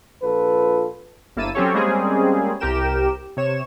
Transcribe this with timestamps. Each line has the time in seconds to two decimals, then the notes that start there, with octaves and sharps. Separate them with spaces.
0.23 A#1 F4 A4 B4
1.36 G1 A#3 E4 A5 E6 D#7
1.55 F#3 C4 C#4 G4 A4 C#5
1.73 G3 G#3 A#3 C4 C#4 G#4
2.60 C2 G4 A#4 G5 E7
3.37 C3 C#5 E7